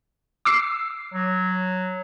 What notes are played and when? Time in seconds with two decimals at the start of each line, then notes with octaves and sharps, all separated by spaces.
0.45 D6 E6 C7
1.14 F#3